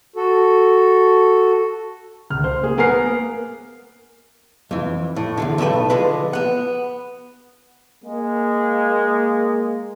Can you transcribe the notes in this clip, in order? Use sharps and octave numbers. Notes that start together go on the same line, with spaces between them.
F#4 A4
C#2 F6
C5
A#3 G#4
B3 A#4 G#5 F6 C7
A#3
F2 E3
A2
E2 G#2 D3
B1 A2 A4 B4 G5
D3 F3 G#3 B4
B3 F#5
G#3 A#3